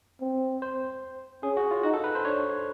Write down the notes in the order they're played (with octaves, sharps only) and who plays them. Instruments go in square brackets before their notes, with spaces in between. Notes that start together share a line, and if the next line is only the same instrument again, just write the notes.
[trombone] C4
[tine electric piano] C5
[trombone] C#4 [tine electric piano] G#4
[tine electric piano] F#4
F4
[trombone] D#4 [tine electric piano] F#4
[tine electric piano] A4
B4
C5
[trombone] D4 [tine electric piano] C#5